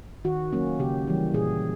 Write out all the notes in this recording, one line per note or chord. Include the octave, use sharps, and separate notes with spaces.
D#3 F#4
F#3 A#3 C#4
C#3 G4
E3 G3
A#2 G#4